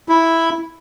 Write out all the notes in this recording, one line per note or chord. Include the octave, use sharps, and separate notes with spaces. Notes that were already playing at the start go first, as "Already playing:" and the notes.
E4